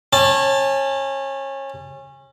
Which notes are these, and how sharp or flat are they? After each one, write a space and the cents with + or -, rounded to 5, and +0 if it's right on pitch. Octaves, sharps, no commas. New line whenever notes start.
C#4 -25 A5 -5